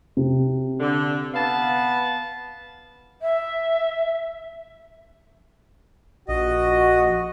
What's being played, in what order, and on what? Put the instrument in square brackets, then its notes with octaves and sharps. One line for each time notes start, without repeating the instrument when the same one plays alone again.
[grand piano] C3
[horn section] D3
B3 F5 A5
[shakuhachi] E5
[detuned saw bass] A#1 [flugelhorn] F#4 [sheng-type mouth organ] D#5